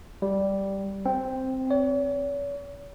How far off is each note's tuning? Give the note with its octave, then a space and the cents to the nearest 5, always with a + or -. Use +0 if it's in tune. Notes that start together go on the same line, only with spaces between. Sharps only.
G3 -5
C4 +0
C#5 +40